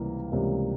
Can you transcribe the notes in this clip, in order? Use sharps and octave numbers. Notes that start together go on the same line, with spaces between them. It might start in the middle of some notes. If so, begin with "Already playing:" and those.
Already playing: C#2 C3 E3 G3 A#3
C#2 C3 E3 G3 A#3